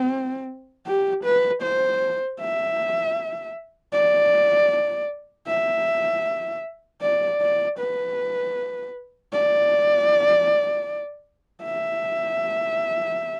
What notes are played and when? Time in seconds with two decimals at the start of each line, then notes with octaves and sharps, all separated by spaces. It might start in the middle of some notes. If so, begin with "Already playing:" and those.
Already playing: C4
0.87 G4
1.24 B4
1.63 C5
2.40 E5
3.93 D5
5.48 E5
7.02 D5
7.41 D5
7.79 B4
9.33 D5
11.64 E5